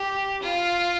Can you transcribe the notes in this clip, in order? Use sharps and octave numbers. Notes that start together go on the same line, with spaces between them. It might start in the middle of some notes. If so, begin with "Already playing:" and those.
Already playing: G4
F4